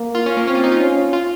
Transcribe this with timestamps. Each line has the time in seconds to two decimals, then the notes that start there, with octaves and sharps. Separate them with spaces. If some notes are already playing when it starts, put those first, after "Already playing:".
Already playing: A#3
0.15 F4
0.26 C#4
0.37 A#3
0.47 C4 C#4
0.55 F4
0.64 D#4
0.72 F4
0.80 C#4
1.13 F4